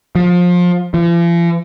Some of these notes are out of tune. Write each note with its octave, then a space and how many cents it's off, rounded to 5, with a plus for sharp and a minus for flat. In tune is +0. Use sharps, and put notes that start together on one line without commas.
F3 +25
F3 -45